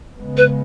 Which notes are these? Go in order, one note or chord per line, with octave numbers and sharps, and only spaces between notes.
C#3 G#3 B3
B4